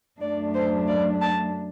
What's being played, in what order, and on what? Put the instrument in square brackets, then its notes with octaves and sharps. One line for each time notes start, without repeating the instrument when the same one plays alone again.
[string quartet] F#2 F#3 A3 D4 D5
C5
D5
A5